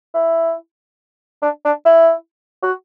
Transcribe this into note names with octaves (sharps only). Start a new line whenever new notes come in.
E4
D4
D4
E4
F#4